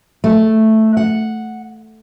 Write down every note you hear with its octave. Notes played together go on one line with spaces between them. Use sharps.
A3
F#5